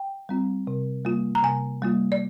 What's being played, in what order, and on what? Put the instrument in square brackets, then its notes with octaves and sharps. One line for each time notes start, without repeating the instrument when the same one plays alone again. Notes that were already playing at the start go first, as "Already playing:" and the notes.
Already playing: [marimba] G5
G3 C4 F4
C3
G3 A#3 F4
A#5
C3 G#5
G3 A#3 F4
D5